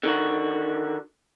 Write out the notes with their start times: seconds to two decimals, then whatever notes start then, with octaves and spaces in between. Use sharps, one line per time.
0.03 D3 D#3 F#4